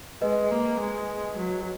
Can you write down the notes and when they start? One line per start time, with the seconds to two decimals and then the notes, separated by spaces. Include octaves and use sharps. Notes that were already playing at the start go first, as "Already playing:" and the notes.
0.22 G#3 B4 D#5
0.51 A#3
0.80 G#3
1.38 F#3